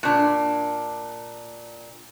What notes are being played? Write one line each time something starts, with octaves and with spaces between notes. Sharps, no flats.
A#2 D4